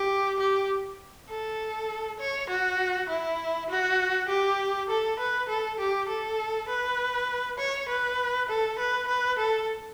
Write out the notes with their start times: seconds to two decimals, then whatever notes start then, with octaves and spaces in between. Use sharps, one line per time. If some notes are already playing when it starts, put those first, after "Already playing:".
Already playing: G4
0.39 G4
1.29 A4
2.19 C#5
2.49 F#4
3.09 E4
3.69 F#4
4.29 G4
4.89 A4
5.19 B4
5.49 A4
5.79 G4
6.09 A4
6.68 B4
7.58 C#5
7.88 B4
8.49 A4
8.79 B4
9.08 B4
9.38 A4